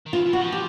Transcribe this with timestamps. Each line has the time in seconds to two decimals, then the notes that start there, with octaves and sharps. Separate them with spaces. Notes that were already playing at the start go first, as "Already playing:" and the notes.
0.06 D#3
0.13 E3 F4
0.26 E3
0.33 F#4
0.39 F3
0.52 G4